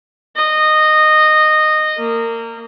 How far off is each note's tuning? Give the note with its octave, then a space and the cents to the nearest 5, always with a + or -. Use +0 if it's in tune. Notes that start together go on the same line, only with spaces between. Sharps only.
D#5 -15
A#3 -25